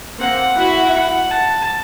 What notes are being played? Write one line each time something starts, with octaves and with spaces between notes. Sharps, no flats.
A#3 C4 F#5
E4 F#4 F#5
F#5
A5